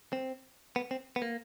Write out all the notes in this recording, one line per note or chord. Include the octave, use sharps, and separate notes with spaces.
C4
B3
C4
B3
A#3